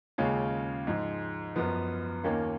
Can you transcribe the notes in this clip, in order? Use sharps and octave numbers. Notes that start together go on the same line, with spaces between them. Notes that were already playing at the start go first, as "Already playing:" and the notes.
D#2 C#3 G#3 C#4 F4
G#2 F3 G#3
F#2 F3 B3
D#2 D#3 A#3 C#4 F4